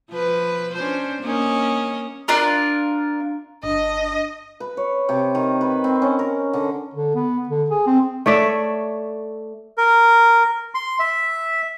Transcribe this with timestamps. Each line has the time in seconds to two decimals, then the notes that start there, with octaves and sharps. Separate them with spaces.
0.11 F3 B4
0.75 C#4 D4 C5
1.22 A#3 C#4 D#5
2.28 D4 F4 A#4
3.63 G1 D4 D#5
4.60 B4
4.77 C#5
5.09 C3
5.35 D#3
5.61 B4
5.84 C4
6.02 C#4
6.19 A#4
6.53 D3
6.94 D3
7.15 B3
7.49 D3
7.70 G#4
7.87 C4
8.26 A3 C#5 D5 E5
9.78 A#4
10.74 C6
10.99 E5